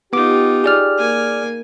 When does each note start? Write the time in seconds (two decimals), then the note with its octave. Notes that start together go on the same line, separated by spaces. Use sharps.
0.13 B3 D#4 F4 G4 D6
0.64 G#4 D5 F6
0.97 A#3 G#5